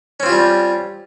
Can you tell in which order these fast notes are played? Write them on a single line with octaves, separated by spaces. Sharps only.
C#4 C4 F4 G4 G3